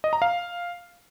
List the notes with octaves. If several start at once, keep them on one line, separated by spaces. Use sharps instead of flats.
D#5
A#5
F5